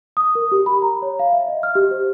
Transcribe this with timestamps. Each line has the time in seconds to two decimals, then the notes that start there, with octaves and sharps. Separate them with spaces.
0.17 D#6
0.35 A#4
0.52 G4
0.66 B5
0.82 A#5
1.02 C#5
1.19 F5
1.33 E5
1.48 D#5
1.63 F6
1.75 G4
1.91 C5